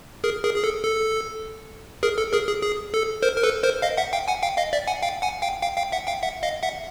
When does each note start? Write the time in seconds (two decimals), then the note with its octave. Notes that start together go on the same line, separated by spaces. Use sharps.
0.24 G#4 A#4
0.44 G#4 A#4
0.56 G#4
0.64 A4
0.84 A4
2.03 G#4 A#4
2.18 A4
2.33 G#4 A#4
2.48 G#4
2.63 G#4
2.94 A4
3.23 A#4 C5
3.37 A#4
3.43 A4 B4
3.63 A#4 C5
3.82 D#5 F5
3.97 E5 F#5
4.13 F5 G5
4.28 F#5 G#5
4.43 F5 G5
4.57 D#5 F5
4.73 D5 E5
4.87 F#5 G#5
5.02 F5 G5
5.22 F#5 G#5
5.42 F5 G5
5.62 F5 G5
5.77 F5 G5
5.92 E5 F#5
6.07 F5 G5
6.23 E5 F#5
6.43 D#5 F5
6.63 E5 F#5